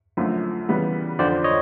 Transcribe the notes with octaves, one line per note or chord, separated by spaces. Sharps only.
F#2 D3 F3 A3
C#3 E3 G3 B3
F2 D3 F3 C5 D5
C#5 D#5